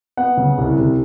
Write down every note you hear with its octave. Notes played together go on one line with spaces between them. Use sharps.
B3 F#5
C#3
C2
C3